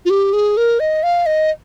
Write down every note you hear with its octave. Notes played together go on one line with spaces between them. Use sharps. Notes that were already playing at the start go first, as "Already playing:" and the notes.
F4
G4
G#4
A#4
D#5
F5
D#5